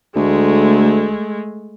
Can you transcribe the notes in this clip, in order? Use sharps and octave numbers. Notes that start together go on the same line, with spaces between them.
D2 G#3 A3